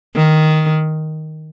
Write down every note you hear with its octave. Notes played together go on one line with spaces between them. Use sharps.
D#3